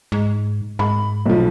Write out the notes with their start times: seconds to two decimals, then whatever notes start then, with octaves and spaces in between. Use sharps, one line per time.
0.12 G#2
0.79 G#2 B5
1.26 B1 F3